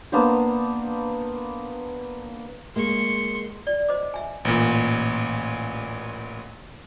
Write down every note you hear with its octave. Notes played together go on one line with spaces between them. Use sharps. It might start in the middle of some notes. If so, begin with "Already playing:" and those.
A#3 B3 D4 C5
G#3 A#3 C6 C#6
D5
C5 D#5 D6
E5 G#5
A1 A#2